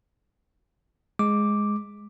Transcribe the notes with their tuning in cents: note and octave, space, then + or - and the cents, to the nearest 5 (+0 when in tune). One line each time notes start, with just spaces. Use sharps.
G#3 +0 D6 +0